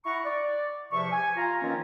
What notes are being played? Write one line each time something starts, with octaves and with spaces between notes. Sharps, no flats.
E4 F#5 A#5 C#6
D5
E2 C3 F3 E5 C#6
G#5
F4 A#5
D#3 E3 A#3 C4 C#4